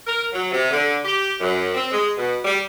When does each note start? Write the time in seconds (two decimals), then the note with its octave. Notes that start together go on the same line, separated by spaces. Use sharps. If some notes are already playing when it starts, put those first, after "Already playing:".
0.07 A#4
0.33 F#3
0.52 C3
0.71 D3
1.05 G4
1.41 F#2
1.74 C4
1.92 G#3
2.17 B2
2.45 G3